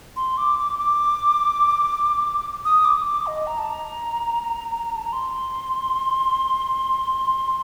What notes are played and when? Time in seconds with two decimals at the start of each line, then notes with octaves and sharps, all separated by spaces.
0.16 C6
0.37 D6
0.59 D6
0.79 D6
2.65 D#6
2.85 D6
3.05 D6
3.27 D#5
3.47 A#5
3.58 A5
3.70 A#5
4.96 A5
5.04 A#5
5.13 C6